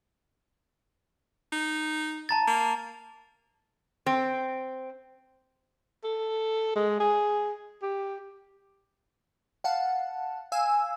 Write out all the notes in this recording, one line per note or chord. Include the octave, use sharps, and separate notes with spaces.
D#4
A5 A#5 A6
A#3
C4
A4
G#3
G#4
G4
F5 F#5 A5
F5 G#5 E6